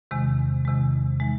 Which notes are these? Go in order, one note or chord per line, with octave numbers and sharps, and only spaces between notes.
E2 C3 D#3 G#3
E2 C3 D#3 G#3
E3 G#3 D#4